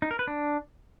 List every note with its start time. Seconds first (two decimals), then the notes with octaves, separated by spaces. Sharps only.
0.02 D#4
0.11 A#4
0.19 B4
0.28 D4